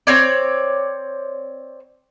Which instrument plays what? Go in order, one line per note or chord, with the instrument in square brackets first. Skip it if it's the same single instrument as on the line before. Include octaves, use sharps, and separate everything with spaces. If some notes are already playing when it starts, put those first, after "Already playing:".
[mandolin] C4 C#5 D5